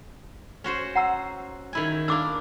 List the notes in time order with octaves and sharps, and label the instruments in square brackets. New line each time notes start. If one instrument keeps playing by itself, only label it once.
[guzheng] C#4 F#4 C5
[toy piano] F#5 A#5 E6
[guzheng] D#3 E4 G#5
[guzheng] A#3 D4 [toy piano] D6 E6